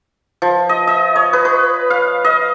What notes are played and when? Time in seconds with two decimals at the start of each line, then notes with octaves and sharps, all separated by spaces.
0.42 F3
0.69 D#5
0.87 D#5
1.16 C#5
1.33 B4
1.45 B4
1.90 F5
2.24 D#5